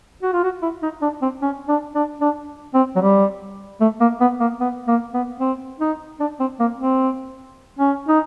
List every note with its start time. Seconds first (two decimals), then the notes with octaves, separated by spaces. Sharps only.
0.23 F#4
0.33 F4
0.44 F#4
0.62 E4
0.83 D#4
1.02 D4
1.22 C4
1.42 C#4
1.68 D4
1.95 D4
2.21 D4
2.74 C4
2.96 F#3
3.01 G3
3.81 A3
4.01 A#3
4.21 B3
4.40 A#3
4.60 B3
4.88 A#3
5.14 B3
5.40 C4
5.80 D#4
6.20 D4
6.40 C4
6.60 A#3
6.79 C4
7.79 C#4
8.09 D#4